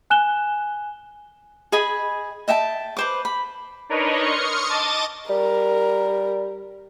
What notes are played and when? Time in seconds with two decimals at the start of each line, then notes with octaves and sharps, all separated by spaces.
0.10 G#5 F#6 E7 G7
1.72 G#4 D#5 G#5 B5
2.48 D#5 E5 G5 A5
2.97 B4 C5 D6
3.25 B5
3.89 D4 D#4 A#4 B4 C#5 D#5
4.22 C6 C#6 D#6 F6 C#7
4.69 D#5 A5 D6 A6 D#7
5.30 G3 A#4